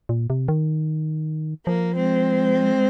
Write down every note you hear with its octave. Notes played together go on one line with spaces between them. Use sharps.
A#2
C3
D#3
F3 A#3
G#3 C4